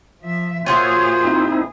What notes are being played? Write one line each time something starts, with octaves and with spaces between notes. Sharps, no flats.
F3 E5
A#2 F4 F#4 G#4 C5 C#5 E5
C4 D#4 E4